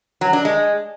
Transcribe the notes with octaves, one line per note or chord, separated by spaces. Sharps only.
F#3
D4
G#3